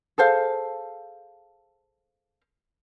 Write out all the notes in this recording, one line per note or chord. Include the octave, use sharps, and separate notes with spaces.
G#4 A4 C5 F5